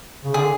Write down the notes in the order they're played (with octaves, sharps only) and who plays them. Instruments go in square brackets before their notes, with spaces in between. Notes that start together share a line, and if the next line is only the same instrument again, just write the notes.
[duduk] C#3
[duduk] D3 [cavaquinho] G#4